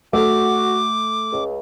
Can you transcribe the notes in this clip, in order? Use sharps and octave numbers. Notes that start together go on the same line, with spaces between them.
A3 F#4 D6
C#2